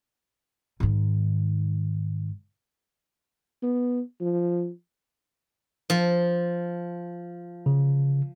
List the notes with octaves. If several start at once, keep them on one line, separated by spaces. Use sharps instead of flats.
G#2 D#3
B3
F3
F3
C#3